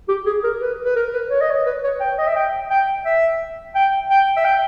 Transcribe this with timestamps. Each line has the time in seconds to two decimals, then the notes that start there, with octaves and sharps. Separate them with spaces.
0.08 G4
0.26 G#4
0.44 A#4
0.61 B4
0.84 B4
0.96 A#4
1.13 B4
1.30 C#5
1.41 D#5
1.50 C#5
1.66 B4
1.84 C#5
2.00 G5
2.18 D#5
2.27 E5
2.36 G5
2.70 G5
3.05 E5
3.75 G5
4.10 G5
4.37 E5
4.45 G5